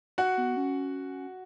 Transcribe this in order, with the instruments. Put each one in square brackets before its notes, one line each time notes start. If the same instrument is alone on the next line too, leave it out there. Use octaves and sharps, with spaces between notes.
[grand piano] F#4 F#5
[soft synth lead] B3
C#4